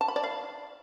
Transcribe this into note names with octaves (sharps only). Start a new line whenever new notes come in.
A5
B5
D5
F5